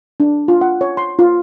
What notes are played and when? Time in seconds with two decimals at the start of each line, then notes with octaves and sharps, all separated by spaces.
0.20 D4
0.48 F4
0.61 F#5
0.81 C#5
0.97 C6
1.19 F4